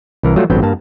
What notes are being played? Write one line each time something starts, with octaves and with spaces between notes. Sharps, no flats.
C2 E3 A#4
F#3 G3 A3 F4 F#4
A1 G2 F#3 B3 C4 G5
G2 A#3 A5